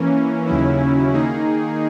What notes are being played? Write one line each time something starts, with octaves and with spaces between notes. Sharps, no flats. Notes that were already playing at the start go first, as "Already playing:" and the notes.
Already playing: E3 A#3 C#4
D#2 C#3 F#3 C#4 E4
D#3 A#3 D#4 G#4